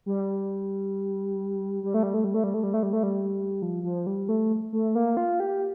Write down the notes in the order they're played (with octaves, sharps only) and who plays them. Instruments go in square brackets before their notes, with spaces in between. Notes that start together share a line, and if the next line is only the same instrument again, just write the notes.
[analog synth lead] G3
G3
A3
G3
A3
G3
A3
G3
A3
G3
A3
G3
A3
G3
F3
F3
G3
A3
A3
A#3
F4
G4